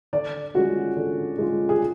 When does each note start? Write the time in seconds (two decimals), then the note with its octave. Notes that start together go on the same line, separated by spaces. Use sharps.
0.13 D3 D5
0.54 G#3 C#4 F4 F#4
0.96 D3
1.38 G#3 C#4 F4
1.69 G#4